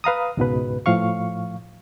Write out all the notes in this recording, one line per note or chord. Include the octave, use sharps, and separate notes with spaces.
B4 F5 A#5 D#6
C#2 G#2 B2 B4
A2 F3 F5 C#6